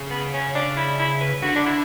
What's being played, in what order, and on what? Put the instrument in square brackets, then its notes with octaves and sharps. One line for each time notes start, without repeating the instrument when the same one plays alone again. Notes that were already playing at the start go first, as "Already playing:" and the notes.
Already playing: [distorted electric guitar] C#3
[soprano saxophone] B3
C#4
D4
E4
E4
B4
[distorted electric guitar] D3 [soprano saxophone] F#4
[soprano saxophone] D4
E4